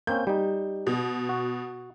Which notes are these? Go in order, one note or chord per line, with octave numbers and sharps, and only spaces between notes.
A#3 C4 C#4 G6
G3 D#4
B2
F#4